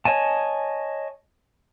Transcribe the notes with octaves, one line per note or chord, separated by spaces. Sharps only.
C#5 D#5 G#5 A5